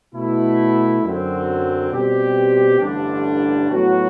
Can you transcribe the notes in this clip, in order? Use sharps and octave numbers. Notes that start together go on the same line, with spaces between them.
B2 A3 E4
F#2 D3 F#3 C4
B2 G3 C4 G4
A1 G2 D3 G3 D4
A2 F#3 B3 F#4